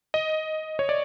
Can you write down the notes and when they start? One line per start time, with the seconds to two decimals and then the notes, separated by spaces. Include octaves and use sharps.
0.14 D#5
0.79 C#5
0.89 D5